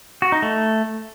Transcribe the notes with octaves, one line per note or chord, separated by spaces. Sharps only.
F#4
D#4
A3